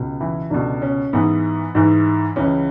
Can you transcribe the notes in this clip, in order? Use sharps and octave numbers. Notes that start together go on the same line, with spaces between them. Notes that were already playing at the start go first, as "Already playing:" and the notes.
Already playing: C#2 B2
E3 E4
C#2 B2 D3 D4
C#4
G#2 E3 B3
G#2 E3
C#2 C#3 E3 C#4